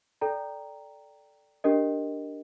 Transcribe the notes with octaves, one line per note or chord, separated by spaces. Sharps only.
A4 D5 G5 A#5
D4 G4 A#4 D#5